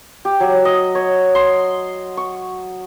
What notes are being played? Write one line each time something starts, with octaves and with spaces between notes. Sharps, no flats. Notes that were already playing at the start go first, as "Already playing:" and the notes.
G4
F#3
D#5
C#5
C6
C#6